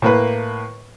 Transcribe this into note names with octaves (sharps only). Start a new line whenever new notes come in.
A2 A#3 B4